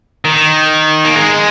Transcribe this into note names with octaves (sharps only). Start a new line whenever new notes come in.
D#3
A#3
G#3